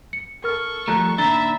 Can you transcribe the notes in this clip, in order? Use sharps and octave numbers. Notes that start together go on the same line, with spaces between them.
C#7
A4 A#4 C#6 F6
F3 G3 A3 A#5 F#6
A#2 D#3 D4 E5 A#5 B5 A6 G7